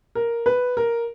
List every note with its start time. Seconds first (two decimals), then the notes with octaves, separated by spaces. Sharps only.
0.15 A#4
0.46 B4
0.77 A#4